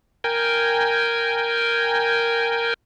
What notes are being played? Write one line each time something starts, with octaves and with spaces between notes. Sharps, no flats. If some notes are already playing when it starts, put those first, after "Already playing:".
A#4 G5 G#5